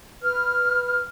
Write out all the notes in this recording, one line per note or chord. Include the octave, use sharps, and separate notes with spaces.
B4 F6